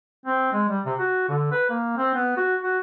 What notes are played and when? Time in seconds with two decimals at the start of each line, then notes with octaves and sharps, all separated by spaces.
0.25 C4
0.52 G#3
0.69 G3
0.85 C3
0.98 F#4
1.28 D3
1.52 B4
1.70 A#3
1.97 C4
2.14 B3
2.37 F#4
2.63 F#4